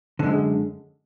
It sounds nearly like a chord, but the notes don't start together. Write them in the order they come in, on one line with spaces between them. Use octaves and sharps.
D3 F#2 G#3